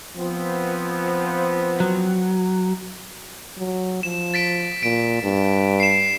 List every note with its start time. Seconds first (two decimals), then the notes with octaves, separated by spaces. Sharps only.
0.16 F3 B3 C4
1.80 F#3
3.58 F#3
4.03 F3 E7
4.34 A6 B6 D7
4.83 A#2 D7
5.23 G2
5.80 C7 E7